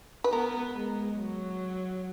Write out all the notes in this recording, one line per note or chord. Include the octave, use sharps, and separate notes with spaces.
B4
B3 A#4
G#3
F#3